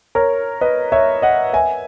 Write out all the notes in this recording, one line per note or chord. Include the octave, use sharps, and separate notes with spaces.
A#4 C#5
B4 D#5
C#5 E5
D#5 F#5
E5 G#5